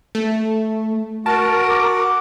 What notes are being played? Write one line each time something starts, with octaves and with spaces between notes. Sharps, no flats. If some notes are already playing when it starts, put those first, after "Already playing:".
A3
F#4 A#4 A5
D6